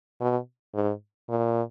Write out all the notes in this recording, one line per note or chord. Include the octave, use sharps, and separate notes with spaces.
B2
G#2
A#2